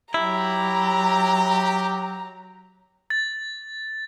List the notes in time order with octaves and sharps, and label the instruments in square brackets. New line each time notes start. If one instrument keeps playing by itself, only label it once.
[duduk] F#3 [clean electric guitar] E4 [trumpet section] G4 [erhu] A#5
[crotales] A6